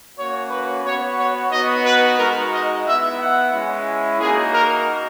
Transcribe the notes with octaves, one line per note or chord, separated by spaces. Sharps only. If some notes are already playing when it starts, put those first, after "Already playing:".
A#3 C#4 F#4 C#5
B4
B3 F#4 C#5
C#5
B3 D#4 F#4 D#5
B4
G#3 D#4 F#4 A#4
D#5
B3 E4 E5
F#5
G#3 C#4 E4
A#3 D#4 F#4 G#4
A#4